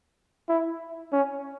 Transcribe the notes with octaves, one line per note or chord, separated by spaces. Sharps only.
E4
C#4